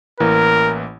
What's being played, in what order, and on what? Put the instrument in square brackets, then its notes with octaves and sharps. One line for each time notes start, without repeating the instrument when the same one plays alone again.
[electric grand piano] A1 E3 A#3 [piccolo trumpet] A#4